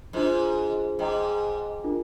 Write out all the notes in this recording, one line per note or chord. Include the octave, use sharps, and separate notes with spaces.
G#2 D4 F4 C5
G#2 G#4 D#5 G5 A#5 D6
D4 F4 A#4